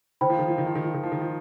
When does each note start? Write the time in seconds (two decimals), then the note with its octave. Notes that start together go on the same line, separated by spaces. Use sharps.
0.21 D#3 C5 G5 B5
0.30 F3
0.39 D#3
0.48 F3
0.58 D#3
0.67 F3
0.75 D#3
0.85 F3
0.94 D#3
1.03 F3
1.12 D#3
1.21 F3